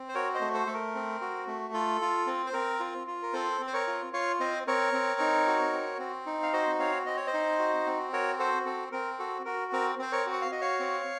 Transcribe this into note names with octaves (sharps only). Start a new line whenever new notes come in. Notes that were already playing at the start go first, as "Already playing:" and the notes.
Already playing: C4
C5
F#4 A#4 C#5
C5 D#5
A3
A4 C5
A3 A4
A#4
C4
F#4
A3
F4 A4
F4
C4
C5
C4 A#4
F4
F4
A#4
C4 A4 C5
C4
C5
A#4 C#5
F4
F4 C#5 F5
C4 C5 D#5
C4 A#4 C#5
C4
D#4
F#4
C4
C4
D#4
F5
F#4 C5 D#5
C4 C#5 F5
C4 D#5
C#5
C5 D#5
D#4
F#4
C4
F#4 A#4 C#5
F#4 A4 C5
C4 A4
C4 A#4
F#4 A4
F#4 A#4
C4 A#4
C4 C5
A#4 C#5
F#4
F#5
F5
F#4 D#5
C#5 F5
C4